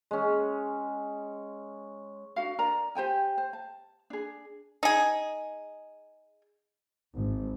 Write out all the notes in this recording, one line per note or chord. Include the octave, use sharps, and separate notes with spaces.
G#3 C#4
D4 F#4 F5
D4 A#4 D5 A#5
G4 C5 G5 G#5
C5
A5
D4 G#4
D#4 G#4
G#1